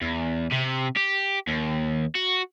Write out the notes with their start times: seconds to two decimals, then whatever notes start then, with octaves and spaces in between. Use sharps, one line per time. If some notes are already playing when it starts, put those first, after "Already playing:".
0.01 E2
0.51 C3
0.96 G4
1.47 D#2
2.15 F#4